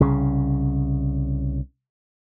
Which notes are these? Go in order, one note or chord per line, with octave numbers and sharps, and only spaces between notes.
C2 C#3